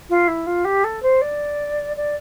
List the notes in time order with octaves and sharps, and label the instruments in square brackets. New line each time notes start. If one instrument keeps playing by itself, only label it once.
[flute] F4
E4
F4
G4
A4
C5
D5
D5